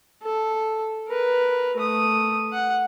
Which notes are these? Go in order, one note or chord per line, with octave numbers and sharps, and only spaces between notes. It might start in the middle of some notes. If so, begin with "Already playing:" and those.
A4
A#4 B4
A3 D#6
F#5